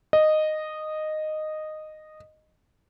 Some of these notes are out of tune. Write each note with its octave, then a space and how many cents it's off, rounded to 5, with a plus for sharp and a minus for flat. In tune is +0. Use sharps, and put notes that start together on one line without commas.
D#5 -10